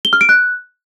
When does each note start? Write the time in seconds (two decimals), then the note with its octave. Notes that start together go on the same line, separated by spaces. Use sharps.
0.05 G7
0.13 F6
0.21 D7
0.29 F#6